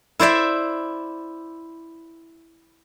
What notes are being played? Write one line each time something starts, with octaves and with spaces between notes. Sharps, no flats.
E4 C5 D5 E5